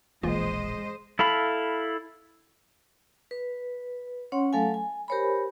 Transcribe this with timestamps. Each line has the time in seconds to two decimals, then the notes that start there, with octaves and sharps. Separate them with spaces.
0.23 E1 A#1 E3 G#3 A#3 F4 C5 D#5
1.19 E4 A4 F5 B5
3.31 B4
4.32 C#4 C#5 F#5 C6
4.53 F#3 A3 A4 F5 G#5
4.74 G#5
5.08 G4 A#4 C5 C#5 G#5 B5